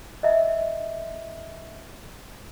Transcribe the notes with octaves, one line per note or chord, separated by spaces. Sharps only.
D#5 E5